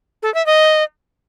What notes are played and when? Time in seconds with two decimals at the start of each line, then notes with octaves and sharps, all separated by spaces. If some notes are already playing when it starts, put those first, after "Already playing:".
0.23 A4
0.34 E5
0.46 D#5